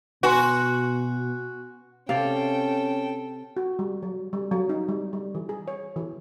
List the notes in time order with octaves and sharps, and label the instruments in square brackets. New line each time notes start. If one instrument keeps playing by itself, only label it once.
[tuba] B2 [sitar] F#4 [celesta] B4 G#5 C6
[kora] C3 D5 [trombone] C#4 [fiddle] A4 G5 [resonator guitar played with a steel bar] F5
[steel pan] F#4
G3
F#3
G3
F#3
D#4
G3
G3
E3
G#4
C#5
E3